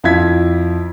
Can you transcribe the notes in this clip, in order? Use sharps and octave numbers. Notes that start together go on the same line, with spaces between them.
F2 E4 F4 E6 G#6 B6